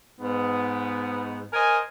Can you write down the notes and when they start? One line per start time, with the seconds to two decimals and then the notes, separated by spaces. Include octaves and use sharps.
0.21 G#2 B3
1.53 A#4 C5 D#5 G#5